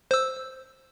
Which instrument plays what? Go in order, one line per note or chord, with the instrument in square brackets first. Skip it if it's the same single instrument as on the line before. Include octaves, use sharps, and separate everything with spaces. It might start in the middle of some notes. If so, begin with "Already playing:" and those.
[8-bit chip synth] C5 E6